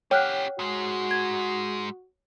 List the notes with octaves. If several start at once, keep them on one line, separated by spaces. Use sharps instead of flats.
C#4 G4 C#5 F#5 G5 F6 F#6
G#2 G#3 F#4
G#6